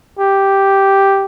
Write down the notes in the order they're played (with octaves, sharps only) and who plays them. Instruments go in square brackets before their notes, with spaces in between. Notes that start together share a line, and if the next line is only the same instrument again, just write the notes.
[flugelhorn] G4